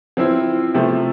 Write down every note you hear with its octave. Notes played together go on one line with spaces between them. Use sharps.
F3 C4 E4
C3 F3 A3